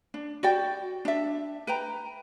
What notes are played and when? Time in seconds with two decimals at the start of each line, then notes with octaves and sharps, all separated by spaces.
0.14 D4
0.43 F#4 D5 G5
1.05 D4 E5
1.67 B4 G5 A#5